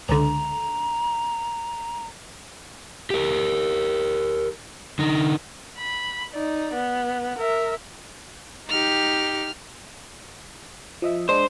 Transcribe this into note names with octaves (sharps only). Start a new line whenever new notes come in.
C#2 D3 A#5
G4 A#4
D3 D#4
B5
D#4 D5
B3
A#4 E5
D#4 G4 F6
F3 D#5 E5
G#3 D4 C5 D#5